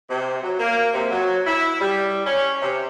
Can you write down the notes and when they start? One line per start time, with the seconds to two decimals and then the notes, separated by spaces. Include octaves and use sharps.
0.09 C3
0.42 F#3
0.59 A#3
0.94 C3
1.11 F#3
1.46 E4
1.81 G3
2.26 C#4
2.62 C3